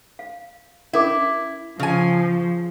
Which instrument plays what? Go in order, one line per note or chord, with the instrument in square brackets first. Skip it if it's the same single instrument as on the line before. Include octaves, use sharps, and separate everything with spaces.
[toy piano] F5
[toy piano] C#4 A#4 D6 [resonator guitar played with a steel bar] E4
[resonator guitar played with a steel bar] C#3 G#5 [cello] F3